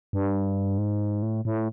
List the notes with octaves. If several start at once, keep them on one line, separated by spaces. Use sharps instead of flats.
G2
G#2
A2
A2